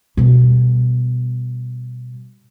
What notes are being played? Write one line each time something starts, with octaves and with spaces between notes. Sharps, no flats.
B2 G3